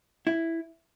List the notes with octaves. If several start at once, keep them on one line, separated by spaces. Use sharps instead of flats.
E4